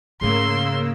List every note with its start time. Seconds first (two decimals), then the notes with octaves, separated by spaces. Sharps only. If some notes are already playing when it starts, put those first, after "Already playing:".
0.21 G#2 C#3 A3 A#3 C6 E6